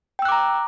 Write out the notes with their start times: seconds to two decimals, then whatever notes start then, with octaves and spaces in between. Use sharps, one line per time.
0.19 G5
0.22 E6
0.25 F#6
0.29 D6
0.32 A#5